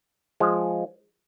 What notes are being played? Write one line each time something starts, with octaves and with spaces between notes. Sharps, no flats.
F3 G#3